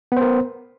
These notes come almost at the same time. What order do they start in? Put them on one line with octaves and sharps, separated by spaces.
B3 C5 A#4